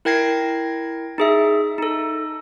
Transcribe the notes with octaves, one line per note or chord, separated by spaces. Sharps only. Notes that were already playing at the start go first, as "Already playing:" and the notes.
E4 A#4 G5 G#6 A#6 C7
D#4 G#4 E5
D#4 A4